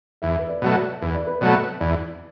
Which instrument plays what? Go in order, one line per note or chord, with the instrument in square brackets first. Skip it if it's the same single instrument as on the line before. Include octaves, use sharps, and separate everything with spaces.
[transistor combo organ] E2 [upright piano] E5
[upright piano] B4
D5
[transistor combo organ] B2 F#3 A3
[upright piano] D5
[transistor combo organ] E2 [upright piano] B4
[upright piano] D5
B4
[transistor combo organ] B2 F#3 A3 [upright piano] D5
[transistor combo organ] E2 [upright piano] D5